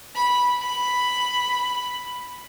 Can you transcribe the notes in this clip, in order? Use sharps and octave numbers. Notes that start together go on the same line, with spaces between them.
B5
B5